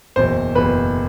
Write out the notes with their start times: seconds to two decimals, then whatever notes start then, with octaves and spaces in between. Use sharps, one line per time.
0.16 F#1 E2 B2 C5
0.55 F#1 E2 B2 B4